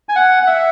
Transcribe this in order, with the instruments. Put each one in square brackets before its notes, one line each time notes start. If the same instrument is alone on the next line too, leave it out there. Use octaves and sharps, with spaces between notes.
[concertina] G#5
F#5
F#5
E5